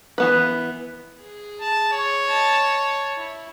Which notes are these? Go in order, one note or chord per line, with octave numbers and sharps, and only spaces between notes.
E3 B3 B4
G#4
A5
C#5
D#5 A5
A5
E4